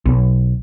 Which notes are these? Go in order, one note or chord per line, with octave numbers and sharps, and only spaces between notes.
B1